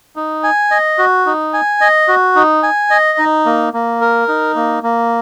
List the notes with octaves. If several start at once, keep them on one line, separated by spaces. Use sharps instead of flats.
D#4
G#5
D#5
F#4
D#4
G#5
D#5
F#4
D#4
G#5
D#5
D#4
A#3
A#3
A#4
D#4
A#3
A#3